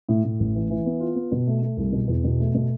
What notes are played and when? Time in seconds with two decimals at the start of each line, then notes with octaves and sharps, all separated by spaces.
0.09 A2
0.24 A2
0.40 A1
0.55 E3
0.70 E3
0.86 B3
1.00 F4
1.15 B3
1.32 B2
1.47 A3
1.62 A3
1.77 C2
1.92 B2
2.08 E2
2.24 B2
2.40 A3
2.55 B2